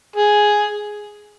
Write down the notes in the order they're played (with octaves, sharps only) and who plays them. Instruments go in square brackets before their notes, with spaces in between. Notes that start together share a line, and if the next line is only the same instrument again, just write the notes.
[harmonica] G#4